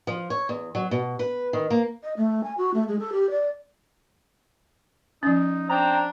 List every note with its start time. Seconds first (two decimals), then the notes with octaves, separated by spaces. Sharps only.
0.07 F3
0.30 C#5
0.49 E2
0.75 F#3
0.91 B2
1.19 B4
1.53 D#3
1.70 A#3
2.03 D#5
2.17 A3
2.44 G#5
2.58 F#4
2.74 A3
2.88 G#3
2.99 A4
3.12 G4
3.30 D5
5.23 F3 C#4 D#4
5.69 C4 D4 A#5